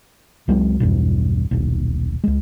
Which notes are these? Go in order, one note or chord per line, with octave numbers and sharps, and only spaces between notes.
C#2 F#3 G#3 C4
B1 E2 G2 B2
D#1 B1
C#2 G#3